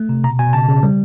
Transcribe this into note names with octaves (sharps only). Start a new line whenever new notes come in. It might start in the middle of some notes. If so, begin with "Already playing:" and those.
Already playing: A3
C3
B2 A#5
B2 G#5
C#3 A5
C#3
G3